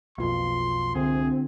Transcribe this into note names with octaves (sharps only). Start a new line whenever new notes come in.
B1 F2 A#3 F4 C6
C2 D3 C4 G#4